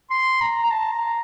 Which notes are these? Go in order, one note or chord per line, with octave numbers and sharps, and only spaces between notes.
C6
A#5
A#5
A5
A#5